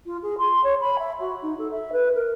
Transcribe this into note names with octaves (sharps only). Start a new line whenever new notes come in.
F4
G#4
C6
C#5
B5
E5
F#4
D#4
A4
E5
B4
A#4